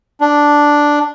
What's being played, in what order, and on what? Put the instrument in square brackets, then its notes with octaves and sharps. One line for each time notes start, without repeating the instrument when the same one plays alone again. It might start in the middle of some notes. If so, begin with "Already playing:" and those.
[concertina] D4